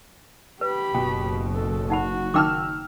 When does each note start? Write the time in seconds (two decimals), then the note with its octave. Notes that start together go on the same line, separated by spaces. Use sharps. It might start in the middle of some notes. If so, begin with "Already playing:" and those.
0.61 G4 B4 B5
0.94 F#1 B2 G5
1.55 A4
1.90 D#4 F#4 F#5 B5
2.34 D#3 D#4 G5 D6 E6 F6